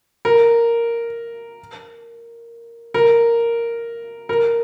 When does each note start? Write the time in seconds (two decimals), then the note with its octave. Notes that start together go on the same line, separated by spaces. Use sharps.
0.25 A#4
2.94 A#4
4.29 A#4